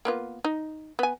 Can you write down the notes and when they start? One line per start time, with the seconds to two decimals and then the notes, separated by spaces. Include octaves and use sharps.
0.05 A#3 B3 F4
0.45 D#4
0.99 B3 G#5